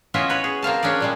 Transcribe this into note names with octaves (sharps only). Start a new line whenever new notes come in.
B3 C#4 E4 F4 D#5 E5
F#4 B4 C#5
G#4
A#3 C4 F5 A5
C#4 D4 G#4 D5
A#2 G3 G#3